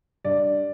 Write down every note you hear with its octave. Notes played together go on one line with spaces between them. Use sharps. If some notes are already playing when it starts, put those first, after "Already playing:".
G2 D5